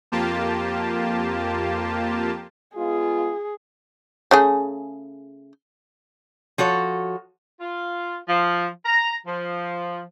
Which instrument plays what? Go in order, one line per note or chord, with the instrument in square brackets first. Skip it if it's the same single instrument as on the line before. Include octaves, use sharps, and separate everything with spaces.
[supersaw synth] F2 A#3 F4 G4 A5
[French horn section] G#3 B3 F4 [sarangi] G#4
[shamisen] C#3 A3 G#4
[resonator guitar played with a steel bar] F3 F#4 A4 C#5
[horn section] F4
F3
A#5
F3